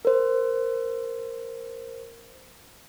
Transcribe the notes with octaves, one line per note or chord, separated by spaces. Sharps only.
A#4 C5